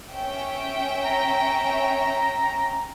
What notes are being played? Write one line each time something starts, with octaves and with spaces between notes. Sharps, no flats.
C#4 E5 G5
A#5